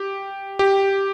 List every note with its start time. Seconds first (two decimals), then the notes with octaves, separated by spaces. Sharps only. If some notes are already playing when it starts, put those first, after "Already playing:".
Already playing: G4
0.59 G4